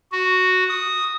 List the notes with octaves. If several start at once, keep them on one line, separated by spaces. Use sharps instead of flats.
F#4
D#6